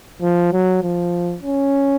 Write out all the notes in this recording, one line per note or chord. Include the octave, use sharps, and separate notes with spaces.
F3
F#3
F3
C#4